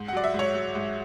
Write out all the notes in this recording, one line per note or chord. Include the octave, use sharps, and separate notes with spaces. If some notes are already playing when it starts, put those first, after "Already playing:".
Already playing: G#2
F#5
F#3 D5
E5
G#2
C#5
F#3
G#2